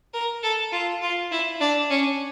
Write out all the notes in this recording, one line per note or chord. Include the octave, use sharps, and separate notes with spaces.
A#4
A4
F4
F4
E4
D4
C#4